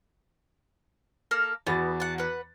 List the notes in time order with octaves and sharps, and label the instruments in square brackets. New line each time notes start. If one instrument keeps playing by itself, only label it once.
[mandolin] A#3 A4 A#4
[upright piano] E2 F#4 A6 [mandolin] B3
[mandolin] F#5 A5
B4 F#5